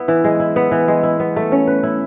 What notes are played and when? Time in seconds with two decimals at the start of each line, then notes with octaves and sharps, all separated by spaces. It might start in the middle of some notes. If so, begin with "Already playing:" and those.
Already playing: B3 E4
0.08 E3
0.24 G#3
0.40 E4
0.56 B3
0.71 E3
0.88 G#3
1.03 E4
1.20 B3
1.36 A3
1.52 C#4
1.67 B4
1.83 E4